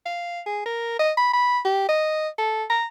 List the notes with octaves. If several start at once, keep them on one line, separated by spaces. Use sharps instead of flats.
F5
G#4
A#4
D#5
B5
B5
G4
D#5
A4
A#5